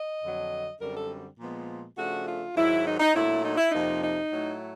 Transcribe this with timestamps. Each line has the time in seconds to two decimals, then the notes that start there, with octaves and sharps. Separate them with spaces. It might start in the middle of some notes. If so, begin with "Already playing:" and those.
Already playing: D#5
0.23 F2 D3 F#3
0.81 F#2 D3 G3 C4 A#4
0.96 A4
1.40 A#2 F3 G#3 B3
1.98 C#3 F3 A3 D4 F#4
2.27 F4
2.56 G#2 D#3 F#3 E4
2.85 D#4
3.00 D#4
3.15 A#2 F#3 A3 D4 E4
3.43 D#4
3.58 E4
3.70 F2 C3 F3 A#3 D#4
4.02 D#4
4.31 A2 F#3 A3